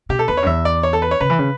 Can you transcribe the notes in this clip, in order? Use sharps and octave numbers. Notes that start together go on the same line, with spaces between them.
B2 G4
A4
E2 B4
C#5
F#2
E2 E5
D5
C#5
A4
B4
C#5
C#3 B4
E3
C#3